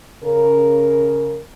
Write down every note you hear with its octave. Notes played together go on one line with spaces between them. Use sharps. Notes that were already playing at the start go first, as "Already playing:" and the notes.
C#3 A#4